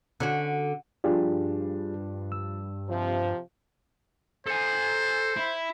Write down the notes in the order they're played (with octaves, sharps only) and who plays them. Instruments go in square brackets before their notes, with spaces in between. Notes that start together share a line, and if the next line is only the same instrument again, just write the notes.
[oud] D3 C#4 F#4
[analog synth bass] G2 [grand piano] F3 D4 [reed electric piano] F4 G4 G#4
[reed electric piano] E6
[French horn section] C3 F3
[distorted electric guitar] A4 G#5 [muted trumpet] C5
[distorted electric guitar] E4